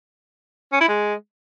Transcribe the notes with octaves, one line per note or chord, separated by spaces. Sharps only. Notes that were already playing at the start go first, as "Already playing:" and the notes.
C#4
E4
G#3